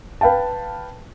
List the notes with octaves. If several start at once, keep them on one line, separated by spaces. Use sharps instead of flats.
B4 F5 G5 A5